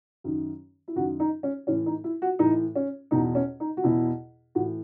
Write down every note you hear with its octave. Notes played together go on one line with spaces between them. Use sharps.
F#2 D#3
E4
F#2 D#3 F#4
D#4
C#4
A2 E3 C#4
D#4
E4
F#4
A2 E3 D#4
C#4
E2 B2 D#4
C#4
D#4
F#4
E2 B2 E4
A2 E3 F#4